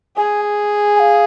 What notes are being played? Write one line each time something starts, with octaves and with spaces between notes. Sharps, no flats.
G#4 G#5
G#5
F5